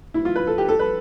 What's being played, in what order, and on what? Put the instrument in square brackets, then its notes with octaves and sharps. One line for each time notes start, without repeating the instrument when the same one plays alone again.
[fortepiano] E4
F4
B4
A4
G4
A4
B4